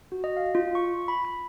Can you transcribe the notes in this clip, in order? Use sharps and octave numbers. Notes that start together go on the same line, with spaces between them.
F#4
D#5
F5
F4
C#6
B5
B5